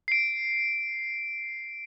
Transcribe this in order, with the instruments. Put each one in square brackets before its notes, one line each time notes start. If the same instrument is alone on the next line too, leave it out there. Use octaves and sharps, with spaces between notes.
[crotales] C7 D7